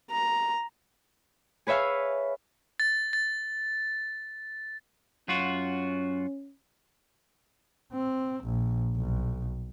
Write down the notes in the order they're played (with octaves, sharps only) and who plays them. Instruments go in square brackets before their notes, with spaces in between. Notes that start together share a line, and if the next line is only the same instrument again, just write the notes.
[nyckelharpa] A#5
[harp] G#4 B4 C#5 E5 F5
[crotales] A6
A6
[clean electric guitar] F#2 F4 F#4 [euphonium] C#4
[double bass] C4
A#1
B1